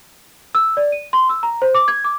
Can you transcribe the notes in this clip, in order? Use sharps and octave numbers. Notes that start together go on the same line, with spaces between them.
E6
D5
D#7
C6
E6
A#5
C5
D6
G#6
D6